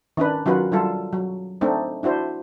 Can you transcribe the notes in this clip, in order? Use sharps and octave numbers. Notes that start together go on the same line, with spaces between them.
D#3 C#4 D4 B4
D#3 F#3 C#4 F4 F#4 B4
F#3 G3 F4 A4
F#3
A3 C4 D4 D#4
D4 E4 F#4 C5